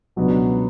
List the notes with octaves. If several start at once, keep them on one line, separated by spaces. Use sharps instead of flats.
C#2 B2 F#3 B3 D4